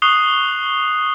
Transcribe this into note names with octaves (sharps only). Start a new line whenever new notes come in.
C#6 D#6 F#6 C7 F7 G7